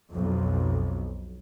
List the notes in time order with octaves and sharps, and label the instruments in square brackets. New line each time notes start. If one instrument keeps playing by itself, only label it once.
[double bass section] B1 F2